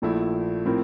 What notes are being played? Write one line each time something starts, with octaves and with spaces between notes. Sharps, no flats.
A#1 A#2 F3 A3 E4
A2 F3 C4 E4 A#4